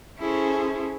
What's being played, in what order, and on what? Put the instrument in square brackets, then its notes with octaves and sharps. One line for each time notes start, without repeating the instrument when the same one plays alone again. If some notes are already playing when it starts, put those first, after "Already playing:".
[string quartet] C#4 E4 G#4 A4 C5